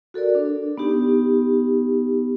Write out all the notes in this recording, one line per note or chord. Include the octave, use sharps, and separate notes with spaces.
F#4 A4 A#4 D5
D4
B3 D#4 G4